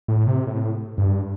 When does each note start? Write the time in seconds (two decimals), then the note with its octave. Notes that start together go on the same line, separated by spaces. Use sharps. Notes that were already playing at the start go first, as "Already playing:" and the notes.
0.08 A2
0.27 C3
0.47 A2
0.98 G2